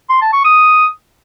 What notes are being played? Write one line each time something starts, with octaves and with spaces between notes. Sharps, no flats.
C6
A5
C#6
D#6